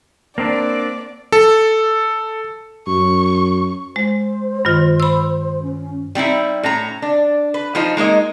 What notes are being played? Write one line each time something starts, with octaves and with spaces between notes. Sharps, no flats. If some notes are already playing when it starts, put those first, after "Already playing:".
A#3 C4 D4 D5
A4
F#2 C#6
G#3 C5
G2 D#3 F4
B5 E6
C#4
G3 C4 D#4 E4
A2 C#4 A#5
D4
B4
F3 D#4 F4 C5 D#5
G#3 A#3 D#4 D#5